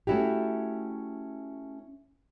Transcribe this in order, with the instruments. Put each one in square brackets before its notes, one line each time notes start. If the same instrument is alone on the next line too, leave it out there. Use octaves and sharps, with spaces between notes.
[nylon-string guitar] A3 C#4 E4 F#4 G4